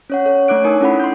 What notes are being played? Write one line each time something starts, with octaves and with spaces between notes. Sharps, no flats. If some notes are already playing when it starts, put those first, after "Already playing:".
C#4 C#5 F#5
A4 C#5
A3 D4 C#5 D6 F#6 D7
D#4 A#4 G#5 D#6
C#4 E4 A4 F#5 B5
C6 G6